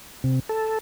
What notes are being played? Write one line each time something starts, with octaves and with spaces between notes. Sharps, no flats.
C3
A4